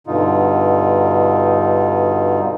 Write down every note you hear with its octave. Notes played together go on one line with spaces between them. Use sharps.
G2 B2 D3 D#4 F4